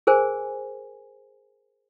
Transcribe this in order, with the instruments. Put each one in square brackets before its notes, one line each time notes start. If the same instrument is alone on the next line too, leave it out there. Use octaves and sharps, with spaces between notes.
[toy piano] G#4 A#4 C5 G#5